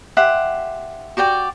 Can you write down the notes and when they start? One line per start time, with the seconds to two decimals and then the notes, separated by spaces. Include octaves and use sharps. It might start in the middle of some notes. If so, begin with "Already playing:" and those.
0.17 G4 E5 F#5 C6
1.17 F#4 G4 D5 G5